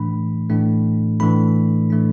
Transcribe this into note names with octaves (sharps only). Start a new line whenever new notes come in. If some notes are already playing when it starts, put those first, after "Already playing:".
Already playing: A2 E3 A3 D4 B5
A2 E3 A3 D4
A2 E3 A3 D4 B5
A2 E3 A3 D4